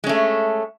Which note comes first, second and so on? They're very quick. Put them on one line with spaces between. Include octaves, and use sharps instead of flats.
G#3 C#4 A3